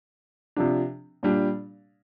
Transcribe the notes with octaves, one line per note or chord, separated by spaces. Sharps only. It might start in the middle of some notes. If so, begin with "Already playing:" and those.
C3 F3 D4
A#2 G3 D4